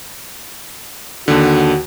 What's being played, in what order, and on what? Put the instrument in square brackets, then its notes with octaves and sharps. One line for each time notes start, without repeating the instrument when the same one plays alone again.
[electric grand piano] D#2 D3 [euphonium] F#4